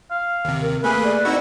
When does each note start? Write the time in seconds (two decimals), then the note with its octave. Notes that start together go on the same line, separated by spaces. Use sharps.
0.11 F5
0.45 D#2 C3
0.62 A#4
0.84 A3 A#3 G#4 B4 G#5
1.04 D5
1.25 C4 D#4 E4 F#4